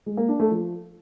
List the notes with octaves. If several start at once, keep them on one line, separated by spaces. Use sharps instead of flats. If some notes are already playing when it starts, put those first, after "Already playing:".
G#3
A#3
D4
A3
F3